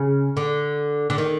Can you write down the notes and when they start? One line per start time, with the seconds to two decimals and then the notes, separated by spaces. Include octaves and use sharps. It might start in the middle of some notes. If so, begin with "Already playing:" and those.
Already playing: C#3
0.37 D3
1.10 D3
1.18 D#3